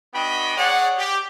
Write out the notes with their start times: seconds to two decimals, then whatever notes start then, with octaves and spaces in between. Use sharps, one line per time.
0.14 B3 D4 F#4 D#5 G5 B5
0.57 G#4 C#5 D5 F#5
0.98 G4